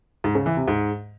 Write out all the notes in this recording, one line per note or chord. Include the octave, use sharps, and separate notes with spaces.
G#2
C#3
E3
C3
G#2